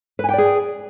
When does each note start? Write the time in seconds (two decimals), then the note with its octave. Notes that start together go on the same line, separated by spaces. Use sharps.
0.19 B4
0.24 G#5
0.29 G5
0.34 D5
0.38 G#4